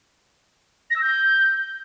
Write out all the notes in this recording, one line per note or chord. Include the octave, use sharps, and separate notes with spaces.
A#6
E6
G6